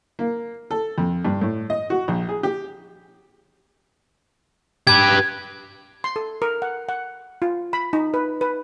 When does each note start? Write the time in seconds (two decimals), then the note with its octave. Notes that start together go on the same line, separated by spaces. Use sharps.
0.19 A#3
0.71 A4
0.98 F2
1.25 G2
1.41 A2
1.70 D#5
1.90 F#4
2.08 A#1
2.29 G#4
2.43 G4
4.87 G4 B4 G#6
6.04 C6
6.16 A4
6.42 A#4
6.62 F#5
6.89 F#5
7.42 F4
7.73 B5
7.93 D#4
8.14 B4
8.41 B4